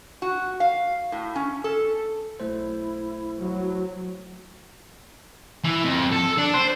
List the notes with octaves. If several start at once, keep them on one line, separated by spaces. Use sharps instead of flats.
F#4
F5
A2
C#4
A4
B1 A3 E4 C5
F#3
E3
F2
A4
D4
C5